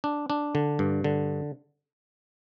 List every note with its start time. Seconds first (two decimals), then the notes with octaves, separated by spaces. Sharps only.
0.04 D4
0.30 D4
0.55 D3
0.79 G2
1.04 D3